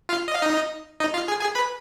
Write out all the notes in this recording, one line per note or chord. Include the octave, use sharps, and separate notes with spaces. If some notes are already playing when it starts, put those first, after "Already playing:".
F4 F5
D#5
F5
D#4 D#5
D#4 D#5
F4 F5
G#4 G#5
G#4 G#5
B4 B5